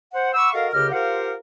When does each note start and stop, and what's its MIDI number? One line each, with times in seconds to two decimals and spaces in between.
0.14 0.34 72
0.14 0.34 78
0.35 0.53 78
0.35 0.53 83
0.35 0.53 85
0.35 0.53 86
0.35 0.53 88
0.53 0.68 66
0.53 0.68 69
0.53 0.68 70
0.53 0.68 75
0.53 0.68 77
0.73 0.90 37
0.73 0.90 49
0.73 0.90 67
0.73 0.90 70
0.73 0.90 75
0.73 0.90 89
0.92 1.33 65
0.92 1.33 67
0.92 1.33 70
0.92 1.33 72
0.92 1.33 77
0.92 1.33 78